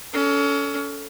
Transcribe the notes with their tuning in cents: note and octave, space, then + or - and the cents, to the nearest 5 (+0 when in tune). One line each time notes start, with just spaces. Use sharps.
C#4 +30 A4 +0